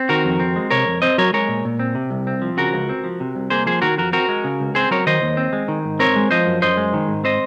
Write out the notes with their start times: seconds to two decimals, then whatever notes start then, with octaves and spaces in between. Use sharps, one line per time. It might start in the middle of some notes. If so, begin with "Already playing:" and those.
Already playing: C4
0.09 D#3 F#4 A#4
0.25 F2
0.40 C4
0.56 G#3
0.70 C3 A#4 C#5
0.87 F2
1.02 C4 C5 D#5
1.18 F#3 A#4 C#5
1.33 G#3 A#4 C#5
1.48 A#2
1.65 A#2
1.79 C4
1.95 C3
2.11 C2
2.27 C4
2.42 F3
2.57 C#3 F#4 A#4
2.74 C#2
2.89 C4
3.04 F3
3.20 C3
3.35 C2
3.50 A#3 G#4 C5
3.66 F3 G#4 C5
3.82 D#3 F#4 A#4
3.98 F2 F#4 A#4
4.13 C4 F#4 A#4
4.29 G#3
4.44 C#3
4.60 C#2
4.75 C4 G#4 C5
4.91 F#3 A#4 C#5
5.07 D#3 C5 D#5
5.22 D#2
5.37 C4
5.53 G#3
5.68 D#3
5.85 G#2
5.99 C4 A#4 C#5
6.16 G#3
6.31 F3 C5 D#5
6.46 F#2
6.62 F#2 C5 D#5
6.77 G#3
6.93 D#3
7.08 G#2
7.24 C4 C5 D#5